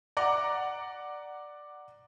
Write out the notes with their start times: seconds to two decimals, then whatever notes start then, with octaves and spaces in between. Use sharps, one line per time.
0.17 D5 F#5 A#5 D6